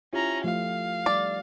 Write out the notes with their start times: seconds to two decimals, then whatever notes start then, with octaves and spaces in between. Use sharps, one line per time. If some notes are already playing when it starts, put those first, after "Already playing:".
0.13 C#4 E4 F4 G4 A#5
0.44 F3 A3 G4 F5
1.06 G3 D#4 D5